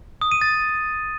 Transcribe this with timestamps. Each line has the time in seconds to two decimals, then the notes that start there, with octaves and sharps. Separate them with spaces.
0.21 D#6
0.31 D#7
0.41 A6